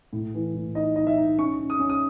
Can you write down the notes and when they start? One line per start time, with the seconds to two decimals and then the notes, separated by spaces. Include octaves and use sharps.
0.13 A2
0.35 E3
0.54 A2
0.75 D#4 D#5
0.96 D#4 D#5
1.07 E5
1.17 D#4
1.38 C#4 C#6
1.59 C#4
1.70 D#6
1.79 C#4
1.90 D#6